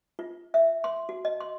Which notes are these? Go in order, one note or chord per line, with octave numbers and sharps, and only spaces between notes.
F4
E5
C6
F#4
D#5
C6